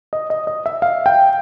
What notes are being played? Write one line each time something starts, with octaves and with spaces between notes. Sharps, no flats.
D#5
D#5
D#5
E5
F5
G5